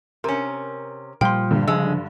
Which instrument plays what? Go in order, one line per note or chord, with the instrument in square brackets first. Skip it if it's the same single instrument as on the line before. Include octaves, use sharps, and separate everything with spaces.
[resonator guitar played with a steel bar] C3 C#4 [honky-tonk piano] A#4
[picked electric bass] A#2 G3 [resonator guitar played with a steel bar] F3 [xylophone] G5 C6
[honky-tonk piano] G2 D3
[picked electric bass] C#3 F3 [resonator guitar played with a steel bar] G#3 [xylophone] E6